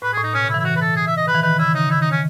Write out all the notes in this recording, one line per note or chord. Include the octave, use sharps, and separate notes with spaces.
A2 B4
A2 G#4
D#4
B2 C#4
C#3
E4
E3
E4
E3 F#4
B4
A4
G#4
E5
D#5
D#3 B4
E3
D#3 B4
C#3 E4
C#3 D#4
D#3 E4
D#4
C#4